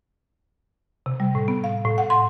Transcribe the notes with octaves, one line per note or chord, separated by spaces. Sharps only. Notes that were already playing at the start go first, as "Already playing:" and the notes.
C3
G3
A2
B3
F5
A2
F#5
C6